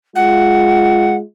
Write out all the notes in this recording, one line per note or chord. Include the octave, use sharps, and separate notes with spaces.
G#3 F4 F#5